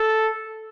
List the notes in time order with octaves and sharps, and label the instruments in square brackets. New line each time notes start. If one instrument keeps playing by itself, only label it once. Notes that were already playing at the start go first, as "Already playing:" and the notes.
Already playing: [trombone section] A4